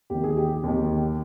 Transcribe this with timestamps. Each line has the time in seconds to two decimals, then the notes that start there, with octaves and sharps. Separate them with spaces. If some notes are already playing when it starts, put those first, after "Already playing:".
0.10 D#2 D#3 G4
0.24 G#4
0.37 G4
0.63 D#2 D#3